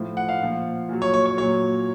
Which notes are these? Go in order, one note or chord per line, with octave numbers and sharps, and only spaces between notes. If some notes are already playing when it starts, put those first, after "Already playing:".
Already playing: A2 F3
F#5
F5
A#2 F3
A#2 F#3
C#5
C#5
C#5
A#2 F#3 C#5